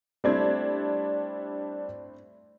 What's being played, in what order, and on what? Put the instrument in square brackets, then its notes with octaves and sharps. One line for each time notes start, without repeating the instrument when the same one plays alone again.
[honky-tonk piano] G3 D4 G#6 [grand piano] A3 C4 E4